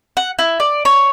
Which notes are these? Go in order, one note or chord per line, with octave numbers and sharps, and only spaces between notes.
F#5
E4
D5
C#5